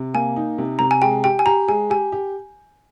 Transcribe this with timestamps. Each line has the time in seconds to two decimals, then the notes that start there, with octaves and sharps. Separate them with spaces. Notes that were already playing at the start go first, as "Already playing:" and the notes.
Already playing: C3
0.14 A#3 G#5
0.36 D#4
0.58 C3
0.79 C3 A#5
0.91 G#5
1.02 G#3 G5
1.24 G4 G5
1.39 G#5
1.46 G4 A#5
1.68 G#3 G#5
1.90 G4 G#5
2.12 G4